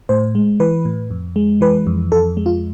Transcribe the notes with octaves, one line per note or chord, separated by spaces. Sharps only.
A2 C5
G#3
E3 B4
A2
F2
G#3
E3 B4
F2
F2 A4
G#3
F4